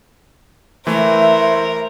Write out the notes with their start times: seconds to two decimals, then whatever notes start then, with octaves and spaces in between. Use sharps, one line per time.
0.87 E3 A3 A#4 C5 E5